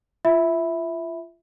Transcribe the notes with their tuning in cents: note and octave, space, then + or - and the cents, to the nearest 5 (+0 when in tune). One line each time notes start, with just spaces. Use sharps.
F4 -30 E5 -5 B5 +0